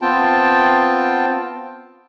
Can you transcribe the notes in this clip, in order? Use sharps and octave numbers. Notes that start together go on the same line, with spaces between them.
B3 C4 F4 G5 A5